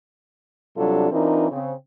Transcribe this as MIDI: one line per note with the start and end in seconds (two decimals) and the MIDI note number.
0.76 1.10 48
0.76 1.10 54
0.76 1.10 55
0.76 1.10 62
0.76 1.10 65
0.76 1.10 69
1.12 1.46 52
1.12 1.46 60
1.12 1.46 62
1.12 1.46 63
1.12 1.46 65
1.12 1.46 70
1.51 1.73 49
1.51 1.73 60